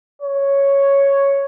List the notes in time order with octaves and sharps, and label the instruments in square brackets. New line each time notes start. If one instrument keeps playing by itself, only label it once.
[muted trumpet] C#5